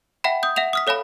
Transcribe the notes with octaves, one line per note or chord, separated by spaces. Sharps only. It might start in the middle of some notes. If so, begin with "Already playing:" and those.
E5 F#5 G5 B5
D#6 G6
E5 F#5 E7 F7
D#6 F6 B6
A4 C#5 F5 G#5 B5